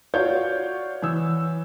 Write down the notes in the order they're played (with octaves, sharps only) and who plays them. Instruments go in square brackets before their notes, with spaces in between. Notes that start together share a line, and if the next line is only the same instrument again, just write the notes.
[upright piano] F4 D5 G6 [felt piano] F#4 C#5
[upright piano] E3 E6